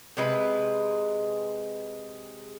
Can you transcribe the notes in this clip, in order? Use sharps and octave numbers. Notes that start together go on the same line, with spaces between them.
C3 G#3 B4